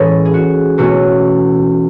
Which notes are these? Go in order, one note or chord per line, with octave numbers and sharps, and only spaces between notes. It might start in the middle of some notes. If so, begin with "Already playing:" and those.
Already playing: A2 E3 G#3 C#4 E4 A4 B4 C#5
G#4
F#4
E2 B2 A3 C#4 F#4